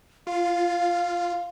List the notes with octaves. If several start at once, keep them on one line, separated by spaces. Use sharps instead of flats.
F4 F5